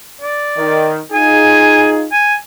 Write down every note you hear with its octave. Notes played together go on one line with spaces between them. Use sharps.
D5
D#3
D#4 F4 G#4 G#5
G#5